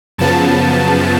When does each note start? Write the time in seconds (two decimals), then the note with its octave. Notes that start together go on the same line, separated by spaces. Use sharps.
0.18 F#2 C#3 F3 B3 A5